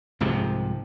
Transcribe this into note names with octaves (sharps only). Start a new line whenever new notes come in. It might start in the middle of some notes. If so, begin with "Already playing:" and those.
C2 G#2 C3 F3